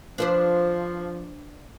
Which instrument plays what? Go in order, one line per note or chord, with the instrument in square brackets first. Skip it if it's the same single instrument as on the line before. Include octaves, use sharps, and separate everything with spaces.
[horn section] F3 [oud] D4 B4 C5